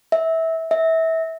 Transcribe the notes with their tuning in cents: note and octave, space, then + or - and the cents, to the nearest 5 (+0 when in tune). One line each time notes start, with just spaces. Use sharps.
E5 -20
E5 -25